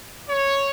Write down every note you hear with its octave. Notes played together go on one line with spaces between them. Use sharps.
C#5